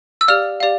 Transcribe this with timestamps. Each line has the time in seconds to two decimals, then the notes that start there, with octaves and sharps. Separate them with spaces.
0.21 E6
0.28 G4 D5 F5 F6
0.60 G4 D5 F5